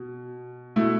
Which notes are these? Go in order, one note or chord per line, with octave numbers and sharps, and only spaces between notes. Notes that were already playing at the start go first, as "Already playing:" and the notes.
Already playing: B2
B2 A3 E4